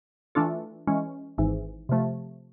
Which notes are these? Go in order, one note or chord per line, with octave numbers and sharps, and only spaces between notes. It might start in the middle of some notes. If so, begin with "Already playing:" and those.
E3 A3 D4 F4 A4
E3 G#3 C#4
G#1 G#2 E3
C3 F3 A3